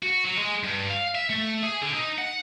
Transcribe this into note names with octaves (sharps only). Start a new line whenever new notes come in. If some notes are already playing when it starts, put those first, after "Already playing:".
F#4
F#3
G#3
G2
F5
E5
A3
G#4
D3
D#4
F#5